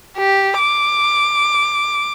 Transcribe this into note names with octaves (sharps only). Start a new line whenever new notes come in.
G4
D6